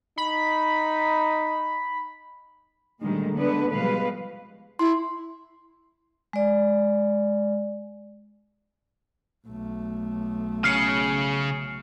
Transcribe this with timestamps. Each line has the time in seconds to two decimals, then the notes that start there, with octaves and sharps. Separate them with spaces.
0.18 D#4 B5
3.01 D2 A#2 D#3 G3 G#3
3.36 D3 G#3 B3 D4 B4
3.73 B2 F3 G3 G#3 B4 F5
4.79 E4 C6
6.33 G#3 D5
9.47 B1 A3
10.64 C#3 C#4 F6 C7 C#7